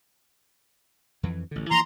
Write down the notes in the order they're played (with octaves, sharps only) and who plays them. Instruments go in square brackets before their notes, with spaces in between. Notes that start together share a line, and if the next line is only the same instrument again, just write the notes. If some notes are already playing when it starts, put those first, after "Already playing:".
[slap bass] F2 E3
A1 D3
[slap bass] E3 F3 A#3 [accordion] A#5 C6